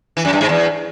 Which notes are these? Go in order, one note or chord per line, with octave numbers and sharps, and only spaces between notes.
E3
F#2
G2
G#2
E2